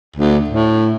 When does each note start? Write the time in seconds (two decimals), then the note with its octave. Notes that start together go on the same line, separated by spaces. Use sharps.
0.16 D2
0.50 A2